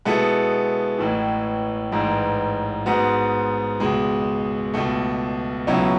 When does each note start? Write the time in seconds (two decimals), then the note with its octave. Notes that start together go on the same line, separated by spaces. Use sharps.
0.05 B2 G#3 B3 E4 A4
0.99 A1 A2 E3
1.92 A1 G#2 E3
2.86 G#2 G#3 B3 F#4
3.80 C#2 B2 G#3
4.74 C#2 B2 A3
5.67 C#2 B2 F#3 C#4 E4